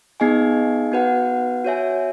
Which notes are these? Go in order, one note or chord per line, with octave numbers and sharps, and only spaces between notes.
B3 D#4 G#4 D#5 G#5
B3 F#4 B4 F#5
F#4 C#5 E5 G#5